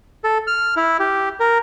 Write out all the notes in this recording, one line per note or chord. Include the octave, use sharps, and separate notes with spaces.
A4
F6
E4
G4
A#4